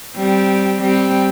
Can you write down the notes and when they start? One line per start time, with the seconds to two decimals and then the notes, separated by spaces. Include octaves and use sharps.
0.17 G3 C4
0.82 G3 C4